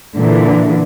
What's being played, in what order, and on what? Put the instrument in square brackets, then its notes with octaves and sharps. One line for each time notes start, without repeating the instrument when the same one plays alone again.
[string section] A#2 D3 E3